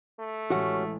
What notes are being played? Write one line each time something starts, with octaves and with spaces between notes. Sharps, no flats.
A3
A1 G#3 C#4 F#4 G4 F#5